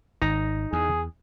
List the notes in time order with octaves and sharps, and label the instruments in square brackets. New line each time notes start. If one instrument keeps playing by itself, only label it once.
[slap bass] G#1 [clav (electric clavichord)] D#4 A#5
[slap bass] E2 [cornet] G#4